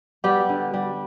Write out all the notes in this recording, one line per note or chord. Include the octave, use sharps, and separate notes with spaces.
G3 B3 G4
D3
G3